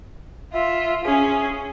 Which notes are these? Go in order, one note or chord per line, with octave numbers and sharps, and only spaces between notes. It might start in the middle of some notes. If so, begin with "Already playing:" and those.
F4 E5
C#4 G#4